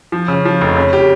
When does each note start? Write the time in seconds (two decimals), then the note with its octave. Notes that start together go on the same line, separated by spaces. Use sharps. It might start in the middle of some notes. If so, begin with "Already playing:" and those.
0.12 F3
0.28 C#3
0.45 F3
0.61 F1
0.76 C#3
0.93 G4